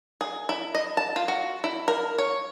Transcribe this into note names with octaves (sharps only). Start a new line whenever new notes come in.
G#4
E4
D#5
A5
F4
F#4
E4
A#4
C#5